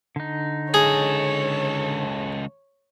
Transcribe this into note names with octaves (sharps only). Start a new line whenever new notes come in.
D3 D#4
C#2 G#4 A4 C#5